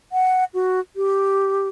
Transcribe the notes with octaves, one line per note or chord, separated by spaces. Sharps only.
F#5
F#4
G4